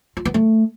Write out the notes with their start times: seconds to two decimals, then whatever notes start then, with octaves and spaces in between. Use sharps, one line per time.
0.17 F4
0.25 B3
0.34 A3